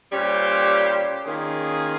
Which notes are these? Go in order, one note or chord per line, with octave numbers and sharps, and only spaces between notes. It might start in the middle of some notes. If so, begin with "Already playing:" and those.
A#2 G3 C#4 G4 C5
D#3 A#3 C#4 F4 G#4